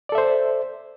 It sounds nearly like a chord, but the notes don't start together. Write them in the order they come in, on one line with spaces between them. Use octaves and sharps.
D5 A4 E5 C5